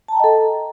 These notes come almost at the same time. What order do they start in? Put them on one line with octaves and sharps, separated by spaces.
A5 A#5 G5 D#5 A4